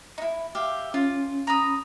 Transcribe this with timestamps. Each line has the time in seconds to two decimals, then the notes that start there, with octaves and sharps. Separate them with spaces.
0.18 D#4 E4
0.55 G4 E5 F5
0.94 C#4 F4
1.47 A#5 B5 D#6